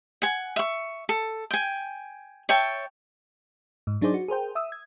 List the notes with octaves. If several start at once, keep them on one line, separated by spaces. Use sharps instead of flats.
F#5 G#5
E5 C#6
A4
G5 G#5
C#5 E5 G5 A5
G#2
F#3 D4 D#4 G#4 C5 D5
F#4
G#4 A#4 C5 G5
E5 D#6 E6
G#6